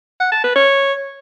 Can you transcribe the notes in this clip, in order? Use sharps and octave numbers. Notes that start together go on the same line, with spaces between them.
F#5
A5
B4
C#5